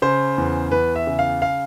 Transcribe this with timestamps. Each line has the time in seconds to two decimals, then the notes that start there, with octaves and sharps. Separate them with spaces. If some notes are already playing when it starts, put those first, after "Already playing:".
0.02 C#3 C5
0.38 E2
0.72 E2 B4
0.96 E5
1.07 C#3
1.19 F5
1.42 F5